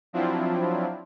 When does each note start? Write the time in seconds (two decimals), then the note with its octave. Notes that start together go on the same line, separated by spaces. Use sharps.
0.13 F3 F#3 C4 D4 E4 F4